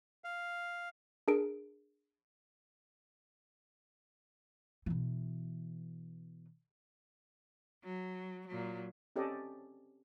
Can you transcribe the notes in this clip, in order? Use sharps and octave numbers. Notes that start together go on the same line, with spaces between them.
F5
D4 G#4 A#4 D7
B2 E3
F#3
A#2 F#3
C4 C#4 G4 A4 D5 D#5